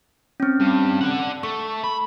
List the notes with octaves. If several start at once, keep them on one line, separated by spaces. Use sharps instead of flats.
C4 C#4
G2
D4 F#5
A3 C#6
B5